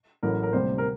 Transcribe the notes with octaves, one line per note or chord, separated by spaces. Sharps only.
A1 A2 F#3 A3 A#4
A#4
D2 C3 G3 A#3 C5
A#4